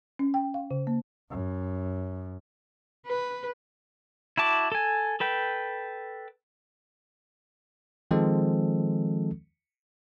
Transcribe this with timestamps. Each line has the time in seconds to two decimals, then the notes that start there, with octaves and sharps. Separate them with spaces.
0.19 C#4
0.34 G5
0.54 F5
0.71 C#3
0.87 A#3
1.31 F#2
3.06 B4
4.37 E4 F#4 A5 D6
4.72 A4 G#5
5.20 A4 B4 G5
8.11 D#3 F3 G#3 C4 A4